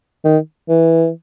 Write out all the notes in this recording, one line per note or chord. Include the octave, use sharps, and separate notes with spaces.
D#3
E3